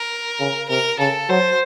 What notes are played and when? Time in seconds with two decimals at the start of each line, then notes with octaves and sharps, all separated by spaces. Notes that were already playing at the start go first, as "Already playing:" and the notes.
Already playing: A#4
0.40 C#3
0.69 C3 A#4
0.99 C#3 A4
1.29 F#3 C5